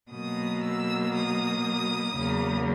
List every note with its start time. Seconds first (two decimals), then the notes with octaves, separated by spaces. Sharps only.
0.11 B2 F#3 A#3 D#6
0.62 E6
1.13 D#6
2.16 E2 C#3 F#3 A#3